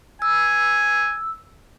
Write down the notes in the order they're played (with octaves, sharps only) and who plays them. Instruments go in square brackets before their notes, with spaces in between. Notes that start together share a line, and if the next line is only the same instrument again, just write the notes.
[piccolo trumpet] G#5 [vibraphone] E6